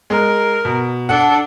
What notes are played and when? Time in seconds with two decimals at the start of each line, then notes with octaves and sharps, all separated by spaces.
0.10 G#3 A#4
0.65 B2
1.09 D4 A4 F#5